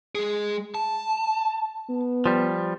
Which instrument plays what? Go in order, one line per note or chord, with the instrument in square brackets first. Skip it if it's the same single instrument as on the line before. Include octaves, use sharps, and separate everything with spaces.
[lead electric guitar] G#3 G#4
A5
[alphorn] B3
[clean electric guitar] F3 G3